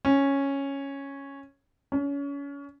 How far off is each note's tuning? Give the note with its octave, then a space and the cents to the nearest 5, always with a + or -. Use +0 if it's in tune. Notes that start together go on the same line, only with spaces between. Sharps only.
C#4 -5
C#4 +30